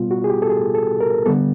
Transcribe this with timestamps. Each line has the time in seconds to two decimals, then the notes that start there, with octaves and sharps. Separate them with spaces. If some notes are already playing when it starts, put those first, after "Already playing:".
Already playing: B2 G3 B3 F4
0.11 F#4
0.24 G#4
0.30 G4
0.42 A4
0.50 G#4
0.75 A4
1.01 A#4
1.25 D3 G3 B3 A4